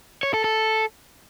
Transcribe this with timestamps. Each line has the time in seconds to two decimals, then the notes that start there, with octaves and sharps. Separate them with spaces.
0.23 C#5
0.34 A4
0.44 A4